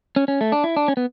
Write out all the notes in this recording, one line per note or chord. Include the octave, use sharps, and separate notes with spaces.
C#4
C#4
A3
D4
E4
D4
C#4
B3